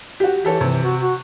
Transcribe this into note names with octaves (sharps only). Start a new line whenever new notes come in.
F#4 G4
E3 G4 A4 C#5
C3 E3
F#4
F#4